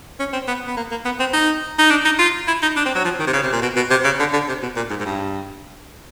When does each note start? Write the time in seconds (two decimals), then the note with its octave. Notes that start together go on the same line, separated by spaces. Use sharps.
0.19 C#4
0.33 C4
0.48 B3
0.67 B3
0.77 A#3
0.91 A#3
1.05 B3
1.20 C4
1.33 D#4
1.79 D#4
1.90 D4
2.05 D#4
2.19 F4
2.48 E4
2.62 D#4
2.76 D4
2.86 C4
2.95 F#3
3.05 F3
3.19 D#3
3.27 C3
3.33 C#3
3.43 C3
3.53 A#2
3.62 B2
3.76 B2
3.91 C3
4.04 C#3
4.19 D3
4.33 D3
4.48 C3
4.62 B2
4.76 A#2
4.90 G#2
5.00 G#2
5.05 G2